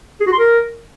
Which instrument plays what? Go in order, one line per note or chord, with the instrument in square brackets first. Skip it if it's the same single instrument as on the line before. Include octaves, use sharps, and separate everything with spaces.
[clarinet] G#4
F#4
C6
A#4